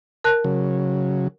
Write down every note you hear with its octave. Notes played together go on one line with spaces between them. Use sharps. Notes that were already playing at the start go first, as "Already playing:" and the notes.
A#4 A5 F#6
C#3 F#3